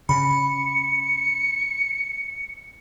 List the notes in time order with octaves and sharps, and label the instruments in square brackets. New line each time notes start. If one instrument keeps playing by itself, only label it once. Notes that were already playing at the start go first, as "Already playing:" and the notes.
[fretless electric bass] C#3 [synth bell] B5 [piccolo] C#7